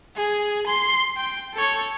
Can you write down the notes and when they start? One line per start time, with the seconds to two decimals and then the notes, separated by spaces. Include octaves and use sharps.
0.16 G#4
0.67 C6
1.17 G5
1.55 A4 C#5